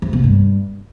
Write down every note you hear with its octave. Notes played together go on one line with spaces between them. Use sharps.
F2
B2
G2